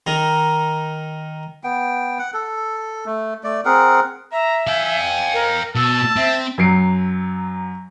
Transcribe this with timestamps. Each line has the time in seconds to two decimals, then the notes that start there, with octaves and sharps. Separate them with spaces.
0.07 D#3 D#4 A#4
1.64 B3 G5
2.19 F#5
2.34 A4
3.06 A3
3.44 A3 D5
3.65 C4 G#4 A#4 F#5
4.32 E5 A#5
4.68 F5 G5 G#5
5.34 A#4
5.75 B2 A5 E6
6.16 C4 E5
6.58 F#2 F#3 C7 D7